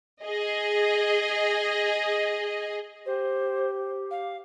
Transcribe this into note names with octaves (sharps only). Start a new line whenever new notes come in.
G#4 D#5
G4 C5
F5